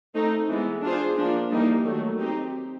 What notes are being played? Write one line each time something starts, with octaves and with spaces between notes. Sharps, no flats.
A3 C4 D#4
E3 G#3 B3
D4 F4 G#4 C5
F3 A#3 D4
E3 G3 A#3 D#4
D#3 F#3 A3
C4 D#4 G4